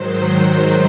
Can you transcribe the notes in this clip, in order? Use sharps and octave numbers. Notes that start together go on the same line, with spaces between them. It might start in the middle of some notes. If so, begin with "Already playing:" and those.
Already playing: G#2 D#3 F#3 C5
C5